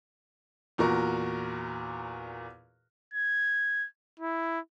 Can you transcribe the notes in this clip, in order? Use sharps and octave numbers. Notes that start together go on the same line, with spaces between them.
E2 A#2 F#4 A#4 C#6
G#6
E4